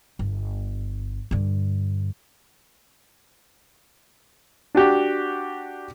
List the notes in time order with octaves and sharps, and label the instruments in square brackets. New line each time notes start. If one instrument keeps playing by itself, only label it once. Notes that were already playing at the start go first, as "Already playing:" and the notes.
[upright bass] G1
G2 D3
[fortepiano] D4 F#4 G4